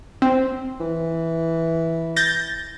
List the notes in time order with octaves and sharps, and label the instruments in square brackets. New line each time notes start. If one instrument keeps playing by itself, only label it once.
[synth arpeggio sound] C4
[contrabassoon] E3
[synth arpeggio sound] G6 A6 A#6